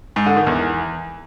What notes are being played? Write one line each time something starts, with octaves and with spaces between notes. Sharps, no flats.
G#2
D3
D#3
E2